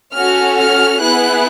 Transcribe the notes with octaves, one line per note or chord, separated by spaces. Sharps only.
C#4 F#4 A4 F6
F6
B3 E4 G#4 F#6